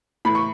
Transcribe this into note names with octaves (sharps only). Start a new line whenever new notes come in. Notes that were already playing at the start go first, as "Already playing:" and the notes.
A2 E3 B5
C#6